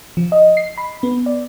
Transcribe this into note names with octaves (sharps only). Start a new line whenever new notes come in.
F3
D#5
C7
B5
B3
D5